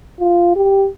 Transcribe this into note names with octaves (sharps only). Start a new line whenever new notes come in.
F4
G4